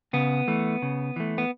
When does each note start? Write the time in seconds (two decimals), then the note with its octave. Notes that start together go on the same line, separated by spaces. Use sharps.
0.13 C#3 B3
0.48 E3 A3
0.82 C#3
1.16 E3 A3
1.38 B3